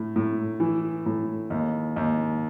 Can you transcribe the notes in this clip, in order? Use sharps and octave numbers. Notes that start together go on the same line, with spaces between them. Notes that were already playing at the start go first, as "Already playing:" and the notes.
Already playing: A2
A2
E3
A2
D#2
D#2